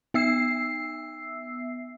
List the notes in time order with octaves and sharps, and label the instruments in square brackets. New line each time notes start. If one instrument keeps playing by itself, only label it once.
[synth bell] B3 E5 E6 C7